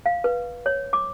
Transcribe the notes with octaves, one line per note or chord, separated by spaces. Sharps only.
F5
B4
C#5
D6